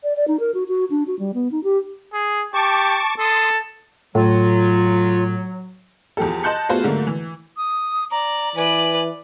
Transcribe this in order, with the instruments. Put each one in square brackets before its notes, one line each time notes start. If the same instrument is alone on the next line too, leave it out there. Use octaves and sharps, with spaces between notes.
[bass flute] D5
D5
D#4
A#4
F#4
F#4
D4
F#4
G3
B3
D#4
G4
[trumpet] G#4
[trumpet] G4 [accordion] A5 C#6 D6
[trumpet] A4 [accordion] C6 D#6
[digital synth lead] A2 [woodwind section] F#3 [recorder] F4
[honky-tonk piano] E2 F3 G4 A4
D#5 A5 C6 F#6 G6 C#7
A3 B3 F4 F#4 G#4 C5
G#2 D3 F#3 A3 A#3
E3
[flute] D#6
[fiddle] D5 [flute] A#5
[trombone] E3 [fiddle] B4 D5 [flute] G#5